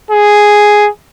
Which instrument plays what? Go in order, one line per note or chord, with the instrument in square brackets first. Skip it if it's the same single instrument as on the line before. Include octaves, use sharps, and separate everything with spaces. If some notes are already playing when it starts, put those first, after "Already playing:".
[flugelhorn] G#4